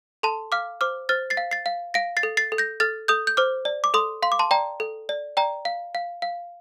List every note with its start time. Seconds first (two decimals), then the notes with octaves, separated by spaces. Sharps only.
0.23 A4 A5 C6
0.52 F5 D6 F6
0.81 C5 D6 F6
1.09 C5 F6 A6
1.30 A6 C7
1.37 F5
1.51 A6 C7
1.66 F5
1.94 F5 A#6 D7
2.17 A6 C7
2.23 A4
2.37 A6 C7
2.52 A4
2.58 G6 A#6
2.80 A4 F6 A6
3.08 A4 D#6 G6
3.27 G6
3.37 C5 D6 F6
3.65 D5
3.84 D6
3.94 A4 C6 D#6
4.23 F5 C6
4.32 D6
4.39 A5 C6
4.51 D5 G5 A#5
4.80 A4
5.09 D5
5.37 D5 G5 A#5
5.65 F5
5.95 F5
6.22 F5